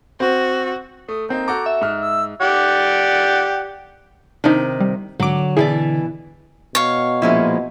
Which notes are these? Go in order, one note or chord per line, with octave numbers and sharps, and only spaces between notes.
C4 F#4
A3 D#6
A#3 C4 D#4 G6
F#4 A4 A#5 D6
E5
G#2 F6 F#6
E6
G4 D5 F#5
C3 D#3 D4 D#4
G3
G#1 D3 F#3 D6
B2 E3 E4 G#4 D5
B2 C#5 F5
A#2 F3 G#3 C#4 E4